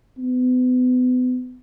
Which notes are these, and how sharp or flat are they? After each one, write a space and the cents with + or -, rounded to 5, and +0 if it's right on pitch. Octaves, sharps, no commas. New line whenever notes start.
B3 +35